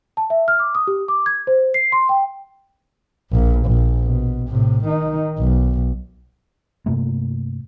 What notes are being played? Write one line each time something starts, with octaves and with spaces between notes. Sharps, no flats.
A5
E5
F6
D6
D#6
G4
D6
G#6
C5
C7
C6
G5
A#1 A#2
A#1
B2
A2 C3
D#3 D#4
B1
G2 C3 A3 A#3